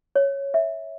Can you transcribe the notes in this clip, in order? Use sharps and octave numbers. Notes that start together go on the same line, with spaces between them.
C#5
E5